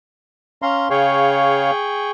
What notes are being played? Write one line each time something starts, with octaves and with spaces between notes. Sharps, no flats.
C#4 F5 A#5 C6
C#3 G#4 C#5 F5 G5 C#6